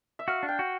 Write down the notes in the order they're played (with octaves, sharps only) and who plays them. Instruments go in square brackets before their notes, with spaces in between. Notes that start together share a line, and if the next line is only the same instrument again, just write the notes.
[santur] E5
[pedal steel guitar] F#4 [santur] F5
[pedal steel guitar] D4
[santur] G5
[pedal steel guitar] F#4